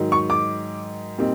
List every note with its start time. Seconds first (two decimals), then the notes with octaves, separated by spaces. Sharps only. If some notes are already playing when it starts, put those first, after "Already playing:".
Already playing: G#2 D#3 F#3
0.12 C#6
0.30 D6
1.18 A#2 G3 C4 D#4